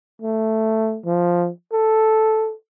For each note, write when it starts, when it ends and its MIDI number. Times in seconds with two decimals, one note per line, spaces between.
0.22 0.99 57
1.06 1.49 53
1.73 2.53 69